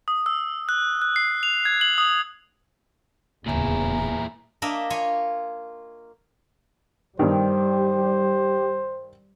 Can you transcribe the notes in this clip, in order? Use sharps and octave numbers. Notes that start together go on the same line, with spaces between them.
D#6
E6
F#6
F#6
C7
F7
G#6
F#7
D#6
D1 E2 A#2 C#3 E4 G#5 A#5
A#3 D4 A#4 D#5 E5
F4 C#5 G#5
G2 D#3 G3 G4 C5